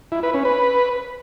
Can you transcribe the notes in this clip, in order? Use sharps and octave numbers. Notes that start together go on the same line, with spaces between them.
E4
B4
C#4
B4